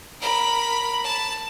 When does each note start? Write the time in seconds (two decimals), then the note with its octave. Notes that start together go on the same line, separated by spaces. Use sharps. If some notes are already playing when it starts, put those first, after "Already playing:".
0.20 A#4 B5
1.04 A5